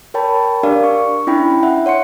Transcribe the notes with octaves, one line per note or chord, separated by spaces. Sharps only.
A#4 C#5 G5 A5 B5
D4 G4 A#4 D5 F5
C#6
C#4 D4 E4 G5 B5
E5 F#5
C#5 F#5 C6 C#7